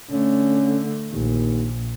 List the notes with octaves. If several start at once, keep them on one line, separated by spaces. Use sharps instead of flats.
D3 A3 C#4
A#1 D#2